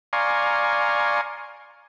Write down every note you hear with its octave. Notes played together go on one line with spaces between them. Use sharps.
D5 F5 G#5 A#5 C6 C#6